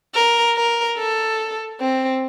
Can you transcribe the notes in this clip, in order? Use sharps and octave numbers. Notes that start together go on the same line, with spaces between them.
A#4
A#4
A4
C4